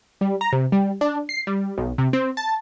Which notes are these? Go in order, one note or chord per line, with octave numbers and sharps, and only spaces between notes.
G3
A#5
C3
G3
D4
C7
G3
B1
C3
C4
A5